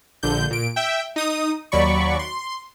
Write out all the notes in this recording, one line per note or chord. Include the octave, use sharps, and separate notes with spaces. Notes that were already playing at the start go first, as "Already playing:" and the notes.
A#1 D3 G6
A#2 D7
E5 G5
D#4 D#6
D#2 F#3 D5 B5 C#6
C6